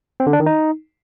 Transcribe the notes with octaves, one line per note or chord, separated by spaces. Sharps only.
C4
D3
D4
D#3
D#4